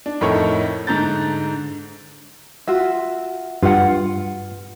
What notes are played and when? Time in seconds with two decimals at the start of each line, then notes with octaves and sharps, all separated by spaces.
0.06 D4
0.21 F2 A2 D#4 A4 A#4 C#5
0.87 G#2 D3 A#5 G6 A6
2.67 F4 F#4 E5
3.63 G2 F4 F#5